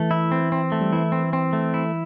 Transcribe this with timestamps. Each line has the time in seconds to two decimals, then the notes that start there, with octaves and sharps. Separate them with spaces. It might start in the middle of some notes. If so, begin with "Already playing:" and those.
Already playing: E3 A3
0.11 E4
0.31 C4
0.52 C4
0.72 A3
0.81 G3
0.92 E3 E4
1.12 C4
1.33 C4
1.53 A3
1.74 E4